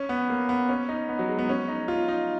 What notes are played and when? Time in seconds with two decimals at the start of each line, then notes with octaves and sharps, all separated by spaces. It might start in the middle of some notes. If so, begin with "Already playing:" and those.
Already playing: C#4
0.09 B3
0.30 A#3
0.49 B3
0.69 C#4
0.89 D#4
1.09 B3
1.19 F#3
1.29 G#3
1.38 B3
1.49 C#4
1.68 D#4
1.88 F4
2.08 D#4